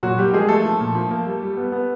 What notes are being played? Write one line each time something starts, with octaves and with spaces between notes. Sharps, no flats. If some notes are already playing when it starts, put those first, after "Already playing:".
A#2 F#3 F#4
G3 A#3 G4
F3 G#3 G#4
A3 A#3 A4
F3
A#2
F3
A#3
G3
G3
B3
B3